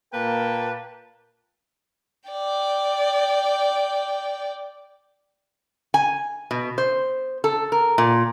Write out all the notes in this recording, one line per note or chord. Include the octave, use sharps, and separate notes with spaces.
A#2 A#3 A#4 B4 G5 A5
D5 G5
G#5
B2
C5
A4
A#4
A#2